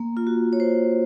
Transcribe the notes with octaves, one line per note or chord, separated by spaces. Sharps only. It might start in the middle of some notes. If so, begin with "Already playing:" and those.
Already playing: A#3
F4
F#4
C#5
C5